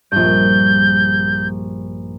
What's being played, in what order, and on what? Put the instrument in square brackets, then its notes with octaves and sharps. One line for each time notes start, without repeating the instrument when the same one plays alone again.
[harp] A#1 G2 [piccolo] G6